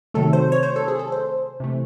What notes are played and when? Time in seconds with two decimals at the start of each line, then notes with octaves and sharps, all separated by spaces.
0.14 C3 D#3 F#3 A3 A4
0.33 C5
0.52 C#5
0.63 C5
0.76 A4
0.88 G#4
0.99 A4
1.12 C5
1.60 C3 E3 A3